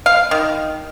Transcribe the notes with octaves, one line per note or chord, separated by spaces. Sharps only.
F5
D#3